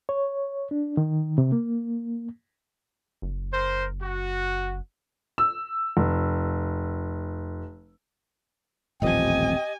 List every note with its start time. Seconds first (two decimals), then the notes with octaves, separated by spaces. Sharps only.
0.09 C#5
0.71 D4
0.97 D#3
1.38 C3
1.52 A#3
3.22 F#1
3.53 A#4 C5
4.02 F#4
5.38 E6
5.97 F1
9.02 D#1 A1 F3 C4 G4 D#5 G#5